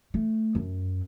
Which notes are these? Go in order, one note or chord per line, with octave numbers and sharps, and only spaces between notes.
A3
F#2